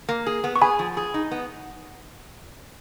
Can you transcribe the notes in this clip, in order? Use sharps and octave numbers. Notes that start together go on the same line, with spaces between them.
A#3
G#4
B3
C#6
G#4 G#5 B5
F3
G#4
D#4
B3